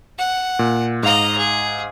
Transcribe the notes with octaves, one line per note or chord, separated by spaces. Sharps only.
F#5
A#2
G#2 D#5 F5 A#5
G#4